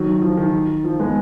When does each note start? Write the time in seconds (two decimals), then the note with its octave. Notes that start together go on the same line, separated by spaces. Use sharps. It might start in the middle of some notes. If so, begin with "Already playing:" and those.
Already playing: D#3 F#3
0.22 F3
0.37 D#3
0.84 F3
1.00 G#3 B3